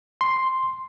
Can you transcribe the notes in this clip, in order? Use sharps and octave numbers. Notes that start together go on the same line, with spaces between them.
C6